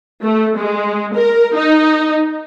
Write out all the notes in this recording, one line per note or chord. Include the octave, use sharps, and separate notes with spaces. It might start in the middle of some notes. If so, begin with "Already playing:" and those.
A3
G#3
A#4
D#4